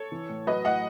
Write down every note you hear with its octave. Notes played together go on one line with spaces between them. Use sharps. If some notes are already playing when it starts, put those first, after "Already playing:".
Already playing: A4 C#5
E3
A2
F#3 B4 D#5
A2 D#5 F#5